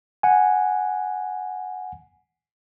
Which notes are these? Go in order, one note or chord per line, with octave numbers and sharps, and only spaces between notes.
F#5 G#5